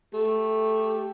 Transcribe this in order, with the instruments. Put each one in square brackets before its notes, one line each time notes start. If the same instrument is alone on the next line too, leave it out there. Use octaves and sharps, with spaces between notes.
[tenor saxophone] A3 [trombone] G4